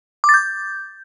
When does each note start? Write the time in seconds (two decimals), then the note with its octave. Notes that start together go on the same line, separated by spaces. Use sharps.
0.24 D6
0.29 A6
0.34 G6